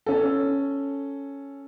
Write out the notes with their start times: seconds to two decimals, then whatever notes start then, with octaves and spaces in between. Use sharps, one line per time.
0.06 C#4 A4